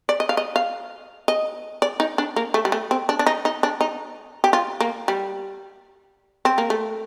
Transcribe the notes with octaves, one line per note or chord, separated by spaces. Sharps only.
D5
D#5
F5
D#5
F5
D#5
D5
D#4
D4
A#3
A3
G3
A3
C4
D4
D4
D#4
D#4
D4
D#4
G4
F4
A#3
G3
C4
A#3
A3